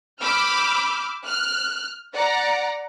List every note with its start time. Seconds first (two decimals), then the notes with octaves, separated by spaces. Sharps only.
0.21 B5 D6 E6 F6 G6
1.23 F6 F#6
2.13 D5 F#5 A#5